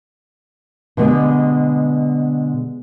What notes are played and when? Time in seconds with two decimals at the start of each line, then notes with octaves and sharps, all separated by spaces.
0.97 B2 D3 G3 G#3 B3